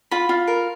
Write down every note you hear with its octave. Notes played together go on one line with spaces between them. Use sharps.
F4 B5
F4
A#4